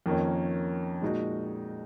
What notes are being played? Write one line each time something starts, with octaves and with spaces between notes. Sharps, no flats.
F2 D#3 A#3 C#4
A#2 G#3 D#4 F#4